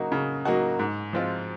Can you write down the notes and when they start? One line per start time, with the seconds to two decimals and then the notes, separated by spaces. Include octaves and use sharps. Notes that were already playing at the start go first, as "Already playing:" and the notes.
Already playing: C#3 F#3 A#3 D#4 F#4
0.12 C#3
0.45 F#3 A#3 D#4 F#4
0.79 G#2
1.13 F3 G#3 C4 F4